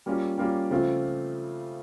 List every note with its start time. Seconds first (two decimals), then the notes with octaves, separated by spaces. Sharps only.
0.06 G3 A#3 C#4 F4
0.38 G3 A#3 C#4 F4
0.70 C#3 F3 A3 C4 F4